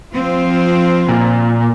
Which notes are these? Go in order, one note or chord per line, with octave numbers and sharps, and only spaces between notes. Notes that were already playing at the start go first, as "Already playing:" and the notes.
F3 C4 F4
A#2